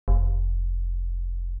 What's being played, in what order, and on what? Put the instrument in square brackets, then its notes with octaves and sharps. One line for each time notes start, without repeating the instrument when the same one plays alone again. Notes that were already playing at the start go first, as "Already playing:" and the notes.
[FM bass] F1